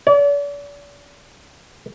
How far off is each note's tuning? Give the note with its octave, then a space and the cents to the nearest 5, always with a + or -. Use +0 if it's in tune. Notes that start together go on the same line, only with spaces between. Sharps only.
D5 -40